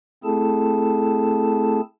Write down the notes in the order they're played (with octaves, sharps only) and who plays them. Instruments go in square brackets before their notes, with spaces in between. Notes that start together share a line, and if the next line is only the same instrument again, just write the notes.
[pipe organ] A3 C4 E4 G#4 A4 A5